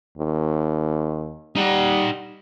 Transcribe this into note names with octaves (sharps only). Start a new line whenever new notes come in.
D#2
G3 D#4 F#5